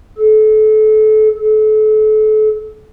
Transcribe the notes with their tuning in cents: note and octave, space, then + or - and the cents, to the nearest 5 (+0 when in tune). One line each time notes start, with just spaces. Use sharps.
A4 -30
A4 -35